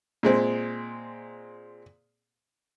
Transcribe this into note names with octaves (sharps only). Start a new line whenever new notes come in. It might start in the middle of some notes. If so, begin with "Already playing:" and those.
A#2 G#3 C4